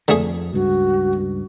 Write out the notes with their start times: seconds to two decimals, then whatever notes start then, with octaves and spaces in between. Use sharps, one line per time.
0.08 F2 D3 A3 G#4
0.53 C#2 G2 F#4